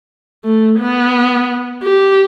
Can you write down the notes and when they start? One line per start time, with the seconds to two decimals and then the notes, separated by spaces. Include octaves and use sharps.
0.44 A3
0.79 B3
1.83 G4